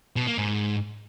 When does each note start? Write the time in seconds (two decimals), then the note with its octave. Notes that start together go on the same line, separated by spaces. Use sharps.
0.16 B2
0.27 A#3
0.38 G#2